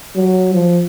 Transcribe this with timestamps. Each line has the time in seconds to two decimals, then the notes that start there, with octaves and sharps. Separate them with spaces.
0.16 F#3
0.54 F3